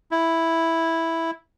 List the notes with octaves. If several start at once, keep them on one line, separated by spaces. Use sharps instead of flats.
E4